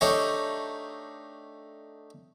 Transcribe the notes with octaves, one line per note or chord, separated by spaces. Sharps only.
A3 D4 D#4 G4 C#5